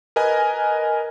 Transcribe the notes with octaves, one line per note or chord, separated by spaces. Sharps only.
A#4 B4 D#5 G#5